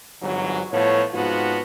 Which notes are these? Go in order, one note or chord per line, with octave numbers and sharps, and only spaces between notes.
G1 G#2 E3 F#3
A2 F3 A3 B3 C#5
G#2 C3 F3 B3 F4 F#4